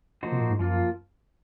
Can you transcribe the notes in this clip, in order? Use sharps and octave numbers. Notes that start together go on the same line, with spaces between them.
F3 A#3 D#4 F#4 C5
C3
A#2
G#2
F#2 F3 A#3 F4